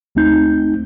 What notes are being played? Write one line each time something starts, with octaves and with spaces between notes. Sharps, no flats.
G1 D#2 A3 C4 D#4 G6